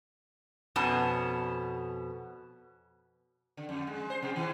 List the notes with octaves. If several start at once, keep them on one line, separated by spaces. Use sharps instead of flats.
F2 B2 B3 C#4 A5
D3
F2
G#3
C5
B2
D#3